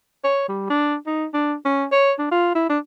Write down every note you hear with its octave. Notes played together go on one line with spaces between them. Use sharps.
C#5
G3
D4
D#4
D4
C#4
C#5
D4
F4
E4
D4